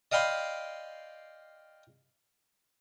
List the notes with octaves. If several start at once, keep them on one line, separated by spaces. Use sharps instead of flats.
D5 D#5 F5 G5 B5 C6